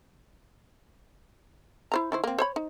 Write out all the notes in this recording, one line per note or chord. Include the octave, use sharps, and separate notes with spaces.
E4 C5 A#5
D#3 E4 C5
A#3 C4
C5 C#5 B5
D#4